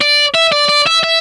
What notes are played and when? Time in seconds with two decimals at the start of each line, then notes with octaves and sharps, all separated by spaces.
0.01 D5
0.35 E5
0.52 D5
0.69 D5
0.87 E5
1.04 E5